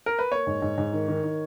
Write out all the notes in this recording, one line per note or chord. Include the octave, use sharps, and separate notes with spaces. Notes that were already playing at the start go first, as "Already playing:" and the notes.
A#4
B4
A#3 C#5
G#2
G#2
G#2
D#3
D#3
D#3